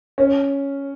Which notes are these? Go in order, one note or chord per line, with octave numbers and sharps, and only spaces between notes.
C#4